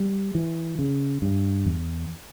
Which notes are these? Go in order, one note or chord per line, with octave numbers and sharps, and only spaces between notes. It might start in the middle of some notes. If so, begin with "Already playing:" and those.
Already playing: G3
E3
C#3
G2
E2